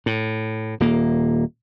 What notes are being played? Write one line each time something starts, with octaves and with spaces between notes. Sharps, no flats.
A2
D#1 A#3